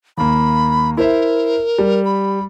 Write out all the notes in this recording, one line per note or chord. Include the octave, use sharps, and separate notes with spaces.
D#2 A#3 B5
E4 A#4 C5 E5
G3
B5